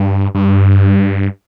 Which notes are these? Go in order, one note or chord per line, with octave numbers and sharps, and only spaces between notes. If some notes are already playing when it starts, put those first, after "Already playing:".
Already playing: G2
G2